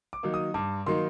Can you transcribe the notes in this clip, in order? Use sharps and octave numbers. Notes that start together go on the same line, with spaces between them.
D6
D#3 F#3 A#3 D#4
D#6
G2 D6
D#3 F#3 A#3 D#4 C6